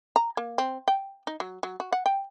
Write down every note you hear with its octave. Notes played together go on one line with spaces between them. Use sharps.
A#5
A#3
C4
G5
D#4
F#3
F#3
F#4
F#5
G5